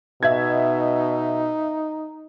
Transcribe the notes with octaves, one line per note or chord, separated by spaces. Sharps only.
B2 D#4 E5 G#6